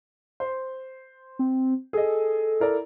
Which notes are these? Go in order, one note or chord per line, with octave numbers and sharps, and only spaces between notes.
C5
C4
G#4 A4 D#5
E4 A#4 D5